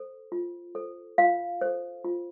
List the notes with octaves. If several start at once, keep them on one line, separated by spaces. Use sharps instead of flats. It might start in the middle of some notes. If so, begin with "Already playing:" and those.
Already playing: A4 C5
F4
A4 C5
F4 F5
A4 C5
F4